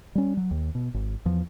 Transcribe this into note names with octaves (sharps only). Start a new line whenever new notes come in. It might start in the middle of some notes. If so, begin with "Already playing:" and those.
G3 C#4
F#3
D#2
B2
G#1
E2 F3